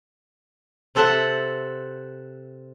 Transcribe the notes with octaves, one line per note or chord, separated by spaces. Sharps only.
C3 C4 A4 E5 F#5 A5